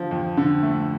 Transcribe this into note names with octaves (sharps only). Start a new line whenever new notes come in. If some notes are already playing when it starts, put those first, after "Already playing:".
Already playing: D3 F3
F2
D3
A3